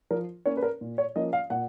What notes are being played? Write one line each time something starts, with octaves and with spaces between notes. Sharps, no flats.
F3 A#4
A#3 C#4 C#5
B4
A#4
A#2
C#5
F3 A#3 C#4 D#5
F5
A#2 F#5